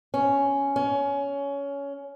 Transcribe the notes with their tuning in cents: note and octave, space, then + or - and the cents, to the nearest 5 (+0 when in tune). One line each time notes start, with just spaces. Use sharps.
C#4 +5
C#4 +20